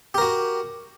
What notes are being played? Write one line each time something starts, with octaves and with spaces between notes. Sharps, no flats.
F#4 G4 A#4